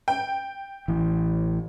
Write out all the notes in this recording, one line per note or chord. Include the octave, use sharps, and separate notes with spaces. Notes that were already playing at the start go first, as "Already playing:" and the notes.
G5
A1 E3